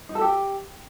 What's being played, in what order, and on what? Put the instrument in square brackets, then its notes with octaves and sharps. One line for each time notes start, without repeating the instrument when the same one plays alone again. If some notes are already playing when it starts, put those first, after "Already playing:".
[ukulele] D#4
A4
G4